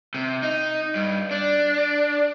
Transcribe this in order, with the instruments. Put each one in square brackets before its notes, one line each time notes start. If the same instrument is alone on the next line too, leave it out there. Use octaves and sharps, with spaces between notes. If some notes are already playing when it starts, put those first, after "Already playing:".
[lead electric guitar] C3
D#4
G2
D4